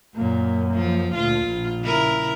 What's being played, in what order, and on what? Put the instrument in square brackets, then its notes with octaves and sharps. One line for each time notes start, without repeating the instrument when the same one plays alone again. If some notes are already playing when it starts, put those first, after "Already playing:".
[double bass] F#2 A#3 [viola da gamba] A#2
[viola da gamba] F3
[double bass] D2 A#2 [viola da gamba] F4
[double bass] A#1
[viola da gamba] C#3 E4 A#4